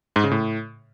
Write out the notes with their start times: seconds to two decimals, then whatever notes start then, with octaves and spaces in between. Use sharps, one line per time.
0.16 G#2
0.24 C#3
0.31 A2